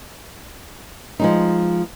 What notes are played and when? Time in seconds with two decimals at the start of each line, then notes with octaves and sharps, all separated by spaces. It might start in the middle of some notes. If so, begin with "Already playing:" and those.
1.19 F3 G#3 D#4